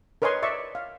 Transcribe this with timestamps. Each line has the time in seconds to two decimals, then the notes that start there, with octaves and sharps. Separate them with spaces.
0.22 A#4 B4 C#5 D#5 G#5 C6
0.42 D5 E5 C#6
0.75 F5